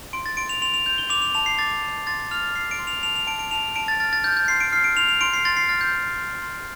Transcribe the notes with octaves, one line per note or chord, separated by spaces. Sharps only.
C6 D7
A6
C6 D7
F7
C6 F7
F7
G6 F7
G7
D6 F7
F7
A5 F7
C7
D6 A6
A5
C6 A6
F6 F7
A6
F6 C7
D7
C6
F7
A5 F7
F7
A5 D7
D7
A5 F7
A5 D7
A6
F6 A6
A6
F6 G6
G6
C6 C7
D7
F6 C7
D7
C6 F7
F7
C6 D7
C7
C6 A6
C7
F6 A6
G6
G6
C6
C6